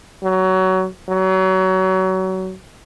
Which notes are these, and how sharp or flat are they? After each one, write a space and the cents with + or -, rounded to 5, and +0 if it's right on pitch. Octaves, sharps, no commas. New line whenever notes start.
F#3 +20
F#3 +30